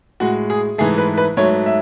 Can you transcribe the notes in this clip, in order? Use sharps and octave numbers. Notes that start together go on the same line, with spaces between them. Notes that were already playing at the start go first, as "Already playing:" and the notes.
A2 G#3 F#4
G#4
G#2 E3 A3 G#4
B4
B4
G#2 F#3 A3 C#5
E5